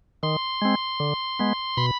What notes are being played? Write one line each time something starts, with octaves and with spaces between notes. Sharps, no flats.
D#3 C6
G#3 C4
D3
G#3 B3
B2 B5